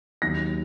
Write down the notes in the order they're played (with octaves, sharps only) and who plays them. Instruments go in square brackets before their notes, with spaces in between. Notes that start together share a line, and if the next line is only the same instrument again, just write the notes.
[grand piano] D#2 D#3 F#3 A#6